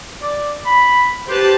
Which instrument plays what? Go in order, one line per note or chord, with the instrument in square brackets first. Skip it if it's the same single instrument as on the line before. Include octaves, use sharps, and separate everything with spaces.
[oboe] D5
B5
[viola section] G4 B4 A5 [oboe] C5